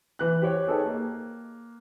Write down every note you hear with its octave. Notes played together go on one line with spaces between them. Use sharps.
E3 F#6
G4 C5 C#5 G5
D#4 G#4 A4 B4 C#5 G5
A#3